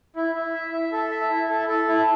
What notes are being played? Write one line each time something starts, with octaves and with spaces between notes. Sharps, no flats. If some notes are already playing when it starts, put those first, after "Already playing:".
E4
E4
E5
E5
A4
E5
E4
A4
A4
E4